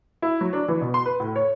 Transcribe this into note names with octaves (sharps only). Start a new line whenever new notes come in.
E4
F#3
D4
E3
B2
C6
B4
A2
C#5